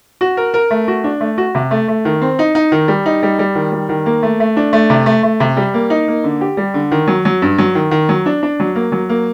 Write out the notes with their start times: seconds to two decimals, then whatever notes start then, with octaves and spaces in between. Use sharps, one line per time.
0.21 F#4
0.37 A#4
0.54 A#4
0.71 A3
0.88 F#4
1.04 D4
1.21 A3
1.38 F#4
1.55 C3
1.71 A3
1.88 A3
2.05 D#3
2.22 C4
2.39 D#4
2.55 D#4
2.72 D#3
2.88 G3
3.06 D#4
3.23 G3
3.39 G3
3.55 D#3
3.72 G3
3.89 D#3
4.06 A#3
4.23 A3
4.40 A3
4.57 D4
4.73 A3
4.90 C3
5.06 A3
5.23 A3
5.40 C3
5.57 G3
5.74 A#3
5.90 D#4
6.08 A#3
6.24 D3
6.41 G4
6.57 G3
6.74 D3
6.92 D#3
7.07 F#3
7.25 F#3
7.42 G2
7.58 F#3
7.75 D#3
7.91 D#3
8.09 F#3
8.26 D4
8.43 D4
8.60 F#3
8.75 A#3
8.92 F#3
9.09 A#3